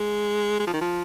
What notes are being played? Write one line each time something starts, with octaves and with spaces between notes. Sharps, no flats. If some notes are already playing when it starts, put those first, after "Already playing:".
Already playing: G#3
G#3
F3
D#3
F3